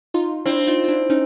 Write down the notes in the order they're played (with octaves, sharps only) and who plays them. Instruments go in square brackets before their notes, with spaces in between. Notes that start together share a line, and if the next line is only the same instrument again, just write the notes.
[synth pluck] D#4 F4
[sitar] C4 [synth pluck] D4 E4
[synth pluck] D#4 F4
F4
D4 E4
C#4 D#4